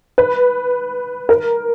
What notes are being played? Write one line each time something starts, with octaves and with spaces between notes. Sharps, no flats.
B4
A#4